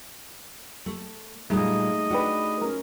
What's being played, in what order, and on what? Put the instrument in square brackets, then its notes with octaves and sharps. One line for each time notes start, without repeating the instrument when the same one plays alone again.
[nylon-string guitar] A3
[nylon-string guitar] A#2 G3 [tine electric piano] A3 D#4 G#4 [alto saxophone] D#5
[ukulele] D4 G4 B4 [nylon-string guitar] F#4
[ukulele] C#4 A#4